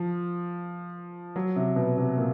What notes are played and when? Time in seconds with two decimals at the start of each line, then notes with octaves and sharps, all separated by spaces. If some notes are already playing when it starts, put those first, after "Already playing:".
Already playing: F3
1.36 F#3
1.56 C3
1.76 B2
1.97 C3
2.18 A#2